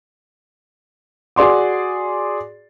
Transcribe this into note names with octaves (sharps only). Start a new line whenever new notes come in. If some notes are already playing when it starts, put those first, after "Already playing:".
F#4 G#4 D5 C6 D6